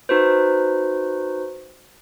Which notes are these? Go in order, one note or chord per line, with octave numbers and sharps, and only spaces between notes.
D#4 F#4 B4 C5